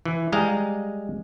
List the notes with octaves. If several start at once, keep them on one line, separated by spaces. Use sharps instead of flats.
E3
G3 G#3 D#5 F5 A#5